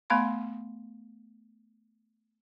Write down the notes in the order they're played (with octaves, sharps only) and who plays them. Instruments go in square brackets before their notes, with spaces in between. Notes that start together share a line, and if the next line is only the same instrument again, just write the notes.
[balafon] A3 B3 F5 B5 C6